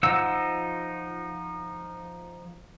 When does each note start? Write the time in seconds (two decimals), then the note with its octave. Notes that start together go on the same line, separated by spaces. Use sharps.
0.03 F3 D#4 F4 F#5 E6